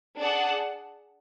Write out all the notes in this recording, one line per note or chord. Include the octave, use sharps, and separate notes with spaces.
D4 G#4 D5 F#5 A5